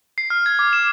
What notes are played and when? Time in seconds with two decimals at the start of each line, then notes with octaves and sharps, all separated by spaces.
0.18 C7
0.30 F6
0.46 G#6
0.59 D6
0.73 E7